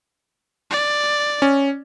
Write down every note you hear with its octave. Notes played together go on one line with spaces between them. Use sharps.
D5
C#4